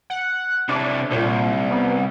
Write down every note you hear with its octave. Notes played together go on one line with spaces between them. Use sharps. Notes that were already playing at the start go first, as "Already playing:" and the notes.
F#5
A2 C3 D4
C2 A#2
B3